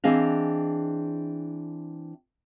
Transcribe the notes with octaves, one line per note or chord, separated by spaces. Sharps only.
E3 C4 D4 G#4 D#5 F5